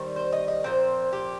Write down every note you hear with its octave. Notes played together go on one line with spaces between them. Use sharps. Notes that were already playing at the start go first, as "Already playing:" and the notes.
Already playing: D#3 G3 C4
C5
D#5
D#5
A#2 F3 C4 C5
G4